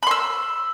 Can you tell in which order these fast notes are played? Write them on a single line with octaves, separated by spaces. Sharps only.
B5 C6 E6